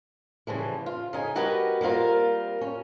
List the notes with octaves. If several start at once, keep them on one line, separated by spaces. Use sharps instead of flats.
C#3 E3 F3 G3
F4
C#3 D#4 G#5
G3 F#4 G4 A#4 B4 D#5
G3 A#3 C4 F4 A#4
C#4